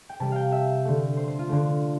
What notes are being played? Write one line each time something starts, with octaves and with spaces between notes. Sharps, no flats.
G5
C3 G3 A5
F5 G5
E5
D3 A3
C5
C5
F4
D3 A3